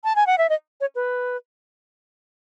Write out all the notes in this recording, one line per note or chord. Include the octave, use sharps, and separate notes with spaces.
A5
G#5
F#5
E5
D#5
C#5
B4